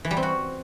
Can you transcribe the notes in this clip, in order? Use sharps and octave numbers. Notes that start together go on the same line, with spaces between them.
E3
G3
C4
F#4